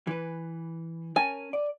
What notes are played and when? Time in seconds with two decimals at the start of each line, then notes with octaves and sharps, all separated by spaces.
0.07 E3 B4
1.16 C#4 A#4 G#5 A5
1.53 D5